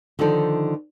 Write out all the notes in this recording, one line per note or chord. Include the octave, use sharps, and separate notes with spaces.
D3 D#3 F3 D#4 A4 D5